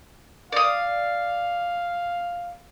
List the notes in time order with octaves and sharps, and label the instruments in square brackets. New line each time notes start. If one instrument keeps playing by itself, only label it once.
[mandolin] D5 D#6 [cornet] F5